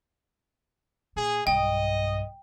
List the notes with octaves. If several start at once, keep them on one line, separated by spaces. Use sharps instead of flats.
A#2 G#4
B1 G2 D#5 G5